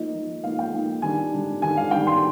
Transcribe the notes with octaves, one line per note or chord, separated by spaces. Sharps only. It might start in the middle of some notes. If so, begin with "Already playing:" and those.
Already playing: F3 A#3 D#4 D#5
F3 A#3 D#4
F3 A#3 D#4 F5
G5
F3 A#3 D#4
D#3 G3 D4 G#5
D#3 G3 D4
D#3 G3 D4 G#5
F5
D#3 G3 D4 G5
C6